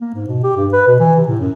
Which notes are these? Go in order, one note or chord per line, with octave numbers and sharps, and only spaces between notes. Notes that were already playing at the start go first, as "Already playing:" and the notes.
A#3
G#2
B2
G4
G2
B4
B2
E3
C3
A2
F#2